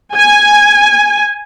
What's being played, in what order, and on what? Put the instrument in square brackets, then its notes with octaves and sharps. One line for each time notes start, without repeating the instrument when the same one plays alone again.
[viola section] G#5